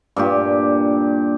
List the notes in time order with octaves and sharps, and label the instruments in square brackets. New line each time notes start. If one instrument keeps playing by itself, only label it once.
[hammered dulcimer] G2 A#2 G4